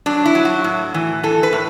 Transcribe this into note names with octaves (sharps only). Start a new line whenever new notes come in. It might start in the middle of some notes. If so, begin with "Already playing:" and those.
F#3 D4
E4
F#3
F#4
A2
E3
E3 A4
B4
A2